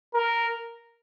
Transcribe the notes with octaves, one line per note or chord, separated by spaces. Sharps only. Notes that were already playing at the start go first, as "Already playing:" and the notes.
A#4